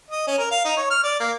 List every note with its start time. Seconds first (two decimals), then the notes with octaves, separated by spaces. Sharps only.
0.10 D#5
0.27 C#4
0.39 A#4
0.51 F5
0.65 D#4
0.77 C#5
0.91 F6
1.04 D5
1.20 A#3